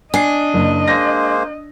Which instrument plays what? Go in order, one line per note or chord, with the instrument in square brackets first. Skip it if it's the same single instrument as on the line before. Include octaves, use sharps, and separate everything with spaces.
[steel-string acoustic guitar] D4 [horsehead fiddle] D#5 [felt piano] G#5 C7
[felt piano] F#1
[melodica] G#3 A#3 C5 [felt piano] A#6